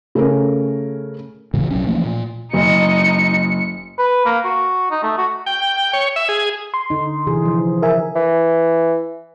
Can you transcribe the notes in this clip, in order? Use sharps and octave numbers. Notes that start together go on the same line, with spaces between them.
C#3 A3 C#4 A#4
A2 C#3 E3 G#3
B1 F#3 C#4
E3 F3 A3 A#3
A#2
F#1 D#4 C#7
B4
A#3
F#4
D#4
A3
F#4
G5
C#5
E5
G#4
C6
D3 D#4
C3 E3 G#4
F3
A#4 E5 G#5
E3